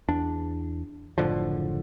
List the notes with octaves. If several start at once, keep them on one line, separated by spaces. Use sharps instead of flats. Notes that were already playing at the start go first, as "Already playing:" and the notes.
E2 D4
F#1 A2 D3 F3